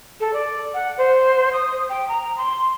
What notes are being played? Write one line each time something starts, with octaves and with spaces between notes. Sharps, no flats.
A4
D5
F#5
C5
D#6
G5
A#5
C6